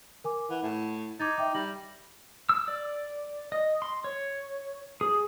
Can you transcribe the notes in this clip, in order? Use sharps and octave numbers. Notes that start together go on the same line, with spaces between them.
A#4 G#5 D6
E3 F#5
A2
D#4 D6 G#6 A6
E5 G5 D6
G3 A#6 F#7
E6
D5
D#5
C6
C#5
G#4